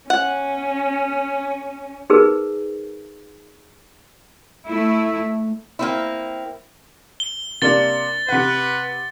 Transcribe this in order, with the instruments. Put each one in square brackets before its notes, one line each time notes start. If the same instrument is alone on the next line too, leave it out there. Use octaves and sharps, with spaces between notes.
[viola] C#4 [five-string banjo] F#5
[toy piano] D#4 G#4 A#4 B4
[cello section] A3 E4
[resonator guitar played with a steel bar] A#3 C4 E4
[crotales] G7
[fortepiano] C3 A#3 D4 [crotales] A6 G7
[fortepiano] C3 F#5 [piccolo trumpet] B4